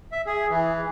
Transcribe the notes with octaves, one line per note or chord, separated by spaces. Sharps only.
E5
G#4
E3